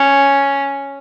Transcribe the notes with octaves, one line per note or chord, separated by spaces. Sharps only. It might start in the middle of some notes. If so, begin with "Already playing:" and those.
Already playing: C#4